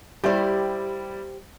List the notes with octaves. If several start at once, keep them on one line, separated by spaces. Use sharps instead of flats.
G3 E4 G4 C5 D5